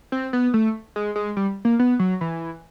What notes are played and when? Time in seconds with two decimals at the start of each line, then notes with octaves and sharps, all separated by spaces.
0.12 C4
0.33 B3
0.54 A3
0.96 G#3
1.16 G#3
1.37 G3
1.65 A#3
1.79 B3
1.99 F#3
2.21 E3